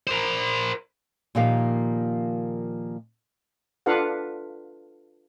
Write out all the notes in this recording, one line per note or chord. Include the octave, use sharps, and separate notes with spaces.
A#4 C5
A#2 D#3 F3 A#3 G4 F5
D4 F4 A4 B4 F5 F#5